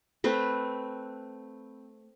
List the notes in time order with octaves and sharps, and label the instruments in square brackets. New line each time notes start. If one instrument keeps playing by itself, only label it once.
[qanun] A3 C4 B4